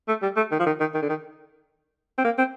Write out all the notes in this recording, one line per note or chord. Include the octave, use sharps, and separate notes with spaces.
A3
G3
A3
D#3
F3
D#3
D#3
D#3
D3
D#3
C4
A#3
C4